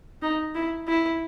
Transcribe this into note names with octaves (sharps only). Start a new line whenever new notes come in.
D#4
E4
E4